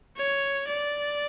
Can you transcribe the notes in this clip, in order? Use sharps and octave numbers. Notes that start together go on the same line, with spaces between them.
C#5
D5